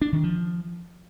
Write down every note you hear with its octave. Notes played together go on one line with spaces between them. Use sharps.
D4
D#3
F3